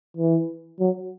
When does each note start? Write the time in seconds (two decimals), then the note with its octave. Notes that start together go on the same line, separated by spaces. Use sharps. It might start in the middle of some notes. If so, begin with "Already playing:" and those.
0.17 E3
0.79 F#3